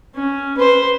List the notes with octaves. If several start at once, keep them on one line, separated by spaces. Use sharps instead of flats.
C#4
B4 C5